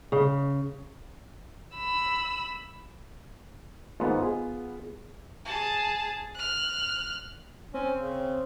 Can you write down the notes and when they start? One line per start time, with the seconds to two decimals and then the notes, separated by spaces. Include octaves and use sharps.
0.12 C#3
1.76 B5 E6
4.00 G#1 G#2 B3 F4
4.22 G#4
5.45 G#4 A5
6.35 F6 F#6
7.74 C4 C#4
7.97 C#3